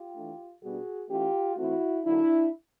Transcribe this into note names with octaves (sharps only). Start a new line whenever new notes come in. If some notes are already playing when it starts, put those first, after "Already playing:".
Already playing: F4 G4
E3 A3 D4
B2 G3 B3 D4 F#4 G#4
E3 A3 C#4 F4 G4
E3 A3 C4 E4 F#4
D3 F#3 A#3 D4 E4